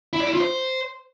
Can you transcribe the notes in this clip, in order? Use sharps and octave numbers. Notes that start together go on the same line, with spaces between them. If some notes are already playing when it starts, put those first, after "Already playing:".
E4
D5
E4
F4
C5